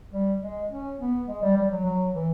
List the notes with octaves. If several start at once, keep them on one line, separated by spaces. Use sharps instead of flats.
G3
G#3
C#4
B3
G#3
G3
G3
F#3
F#3
E3